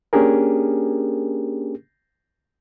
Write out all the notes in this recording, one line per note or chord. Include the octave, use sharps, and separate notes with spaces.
A#3 C#4 D4 G4 G#4 A#4